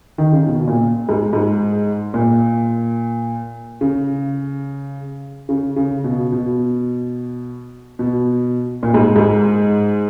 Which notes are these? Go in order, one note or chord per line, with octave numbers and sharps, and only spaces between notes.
D#3
C#3
B2
A#2
G#2
G#2
A#2
C#3
C#3
C#3
B2
B2
B2
A#2
G#2
G#2